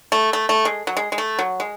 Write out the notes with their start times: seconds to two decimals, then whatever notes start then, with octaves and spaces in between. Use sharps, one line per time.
0.12 A3
0.33 A3
0.49 A3
0.65 G#3
0.87 F#3
0.97 G#3
1.12 G#3
1.18 A3
1.39 F#3
1.60 G#3